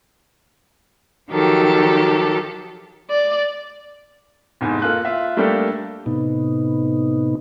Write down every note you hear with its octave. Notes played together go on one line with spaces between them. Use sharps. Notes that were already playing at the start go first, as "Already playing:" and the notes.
D#3 F3 F#3 G4 A4
D5
F1 E2 G#2
A#3 F4 A4 F#6
F4 E5
G3 A3 A#3 D4 G4 A4
A2 C3 B3 D#4